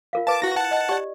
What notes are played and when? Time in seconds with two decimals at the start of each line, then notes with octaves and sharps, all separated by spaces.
0.13 F4 A#4 F5
0.27 B4 F5 A5 D6
0.42 E4 F#4 A#6
0.56 F#5 A5
0.71 D#5
0.89 G4 D5